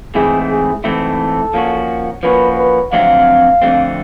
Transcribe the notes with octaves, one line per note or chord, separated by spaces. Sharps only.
G#2 E3 A3 C4 E4 G#4
G#4
G#2 E3 A3 C4 E4 A4
F3 A#3 C#4 F#4
F3 A#3 C#4 F#4 B4
B4
F2 D3 F#3 A3 C4 F5
F2 D3 F#3 A3 C4